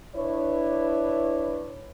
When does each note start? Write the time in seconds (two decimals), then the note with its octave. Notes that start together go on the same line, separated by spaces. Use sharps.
0.15 D4 E4 B4 C#5